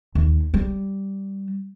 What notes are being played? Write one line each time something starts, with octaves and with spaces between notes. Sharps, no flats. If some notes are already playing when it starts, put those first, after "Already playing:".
D#2
G3